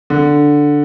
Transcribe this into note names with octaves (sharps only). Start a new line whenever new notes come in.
D3